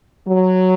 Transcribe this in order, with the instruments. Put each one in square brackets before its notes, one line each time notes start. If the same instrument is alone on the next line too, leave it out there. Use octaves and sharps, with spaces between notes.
[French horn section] F#3